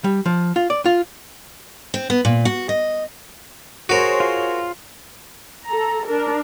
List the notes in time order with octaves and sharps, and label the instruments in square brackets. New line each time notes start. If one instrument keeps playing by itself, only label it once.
[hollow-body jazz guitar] G3
F3
F4
D5
F4
[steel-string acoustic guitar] C4
B3
A#2
F#4
D#5
[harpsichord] F#4 A#4 [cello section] G#4 C5 C#5
[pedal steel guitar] F4
[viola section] A4 A#5
D4 A#4